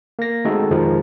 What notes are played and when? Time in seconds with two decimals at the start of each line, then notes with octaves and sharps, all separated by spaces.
0.19 A#3 A#6
0.45 G#3 A3 C4 D#4 F#4 A4
0.70 F2 B2 D#3 F3 G#3 D#4